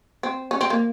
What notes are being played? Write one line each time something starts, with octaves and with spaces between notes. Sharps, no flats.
C4
C#4
C4
A#3